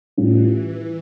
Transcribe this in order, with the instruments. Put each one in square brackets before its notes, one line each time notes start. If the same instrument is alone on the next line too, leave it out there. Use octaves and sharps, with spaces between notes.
[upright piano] A2 G3 C#4 F4 [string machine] E3